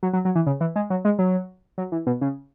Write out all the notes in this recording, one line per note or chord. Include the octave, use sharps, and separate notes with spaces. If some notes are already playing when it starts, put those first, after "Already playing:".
F#3
F#3
F#3
E3
C#3
E3
G#3
F#3
G#3
F#3
F#3
E3
B2
C#3